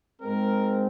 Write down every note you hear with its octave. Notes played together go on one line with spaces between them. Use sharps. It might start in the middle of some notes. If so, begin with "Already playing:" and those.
G#2 G#3 C4 A#4